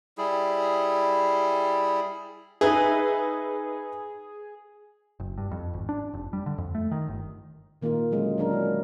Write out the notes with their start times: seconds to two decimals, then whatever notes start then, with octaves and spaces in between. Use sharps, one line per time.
0.18 G3 E4 G#4
2.61 D#4 G#4 B4 E5
5.20 F#1
5.38 G2
5.51 F2
5.74 G#1
5.89 D4
6.13 F1
6.33 G3
6.46 D3
6.58 F2
6.75 A3
6.91 D#3
7.08 G1
7.82 A#2 D#3 A#3 D#4 F4 A#4
8.11 D3 F#3 G#3 C#4
8.38 F#3 G3 D4 G#4 A#4
8.53 E4